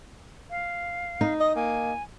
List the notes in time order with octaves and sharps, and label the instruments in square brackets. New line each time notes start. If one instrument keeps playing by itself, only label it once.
[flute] F5
[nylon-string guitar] D#4
[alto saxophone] D#5 [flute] D#6
[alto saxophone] A#3 [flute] G#5